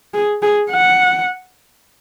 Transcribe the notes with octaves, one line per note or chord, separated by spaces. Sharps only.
G#4
G#4
F#5